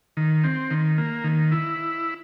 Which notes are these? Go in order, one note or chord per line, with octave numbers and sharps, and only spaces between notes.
D#3
C4
D#3
A#3
D#3
E4